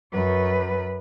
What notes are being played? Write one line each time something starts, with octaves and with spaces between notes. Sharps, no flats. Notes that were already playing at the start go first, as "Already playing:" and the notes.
F#2 B4